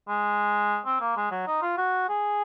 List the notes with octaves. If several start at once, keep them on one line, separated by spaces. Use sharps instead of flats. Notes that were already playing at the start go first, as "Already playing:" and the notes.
G#3
C4
A#3
G#3
F#3
D#4
F4
F#4
G#4